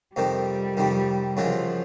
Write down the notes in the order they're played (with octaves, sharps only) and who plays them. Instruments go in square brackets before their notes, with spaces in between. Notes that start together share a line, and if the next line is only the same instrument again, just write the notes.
[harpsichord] F2 C3 D#3 [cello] G3
[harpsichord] F2 C3 D#3
[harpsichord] F#2 C#3 E3 G#3 [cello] F3